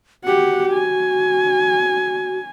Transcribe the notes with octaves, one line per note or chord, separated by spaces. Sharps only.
F#4 G4 F#5
G#5